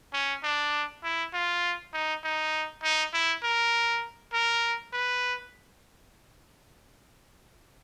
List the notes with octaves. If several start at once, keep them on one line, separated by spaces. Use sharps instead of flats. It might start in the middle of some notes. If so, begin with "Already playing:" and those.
C#4
D4
E4
F4
D#4
D#4
D#4
E4
A#4
A#4
B4